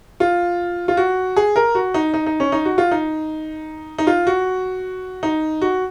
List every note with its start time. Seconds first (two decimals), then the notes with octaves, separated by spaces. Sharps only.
0.20 F4
0.88 F4
0.97 F#4
1.36 G#4
1.56 A#4
1.75 F#4
1.94 D#4
2.14 D#4
2.26 D#4
2.40 C#4
2.52 D#4
2.65 F#4
2.78 F4
2.91 D#4
3.98 D#4
4.07 F4
4.27 F#4
5.23 D#4
5.61 F#4